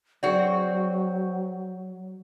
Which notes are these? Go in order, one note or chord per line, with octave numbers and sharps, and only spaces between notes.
F#3 C4 F#4 G#4 D5